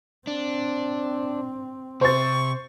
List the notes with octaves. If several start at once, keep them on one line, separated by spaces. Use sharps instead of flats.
C4 D4
C3 C5 C#6 A6